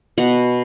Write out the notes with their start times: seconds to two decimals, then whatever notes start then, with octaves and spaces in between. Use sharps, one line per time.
0.18 B2 F#5